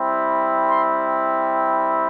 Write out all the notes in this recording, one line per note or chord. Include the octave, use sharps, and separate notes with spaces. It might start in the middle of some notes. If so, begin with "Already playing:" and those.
Already playing: G3 C4 E4
C6